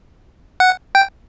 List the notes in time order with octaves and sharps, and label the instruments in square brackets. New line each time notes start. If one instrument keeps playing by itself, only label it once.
[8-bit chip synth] F#5
G5